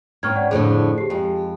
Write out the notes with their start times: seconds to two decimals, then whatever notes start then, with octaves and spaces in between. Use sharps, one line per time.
0.23 G#2 C4 C#4 C#6 F6 G#6
0.36 D5 F#5
0.51 F2 A2 D3 G#4 C5
0.98 G4 C7
1.10 F2 G#3 G4